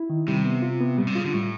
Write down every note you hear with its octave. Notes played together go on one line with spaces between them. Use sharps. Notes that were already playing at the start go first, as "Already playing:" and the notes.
Already playing: E4
D#3
C3 G3
B3
F4
B3
A#2 G3
C3
C#3 F4
D3
A2 G3